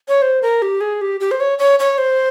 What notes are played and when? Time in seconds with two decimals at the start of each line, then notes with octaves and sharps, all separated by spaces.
0.09 C#5
0.22 C5
0.42 A#4
0.62 G4
0.81 G#4
1.01 G4
1.20 G4
1.31 C5
1.40 C#5
1.59 C#5
1.79 C#5
1.98 C5